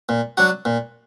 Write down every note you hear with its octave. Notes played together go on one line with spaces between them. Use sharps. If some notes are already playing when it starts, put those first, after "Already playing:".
A#2
F#3 D4 F#4
A#2